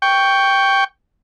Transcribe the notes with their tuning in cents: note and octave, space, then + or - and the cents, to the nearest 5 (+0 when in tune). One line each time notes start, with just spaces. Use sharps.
G5 +0 C#6 +10